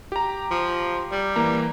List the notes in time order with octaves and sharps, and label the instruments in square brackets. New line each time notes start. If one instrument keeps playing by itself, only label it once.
[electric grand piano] G4 A#5
[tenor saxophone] F3
G3
[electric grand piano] E3 A#3 A#5